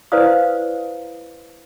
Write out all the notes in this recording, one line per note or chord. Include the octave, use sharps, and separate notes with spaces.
E4 B4 C5 D5 F5 D#6